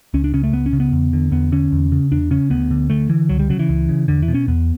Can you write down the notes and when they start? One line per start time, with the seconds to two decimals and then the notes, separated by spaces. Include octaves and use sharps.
0.14 C#2 C#4
0.24 D4
0.34 C#3 C#4
0.44 A3
0.53 C#2 B3
0.66 C#4
0.73 C#3
0.80 B3
0.92 E2
1.13 D3
1.32 E2 B3
1.52 D3 C#4
1.72 E2
1.92 C#3
2.12 E2 D4
2.31 C#3 C#4
2.50 D2 B3
2.71 D3
2.90 D2 A3
3.09 D3 E3
3.29 C#2 F#3
3.39 G3
3.49 C#3 F#3
3.59 E3
3.69 C#2
3.89 C#3
4.08 E2 D3
4.22 E3
4.28 B2
4.34 C#4
4.48 E2 B3